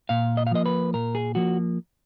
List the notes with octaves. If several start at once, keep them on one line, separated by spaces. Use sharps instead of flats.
A#2 F5
D#5
F5
F3 A#3 D#5
B4
A#2 A#4
G#4
F3 A#3 F#4